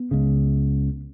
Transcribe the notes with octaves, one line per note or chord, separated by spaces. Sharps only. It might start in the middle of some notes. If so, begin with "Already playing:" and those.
Already playing: B3
C#2 C#3